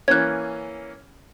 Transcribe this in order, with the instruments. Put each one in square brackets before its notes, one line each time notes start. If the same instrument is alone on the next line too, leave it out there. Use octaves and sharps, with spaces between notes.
[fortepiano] E3 A#3 C#4 [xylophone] F#6 G#6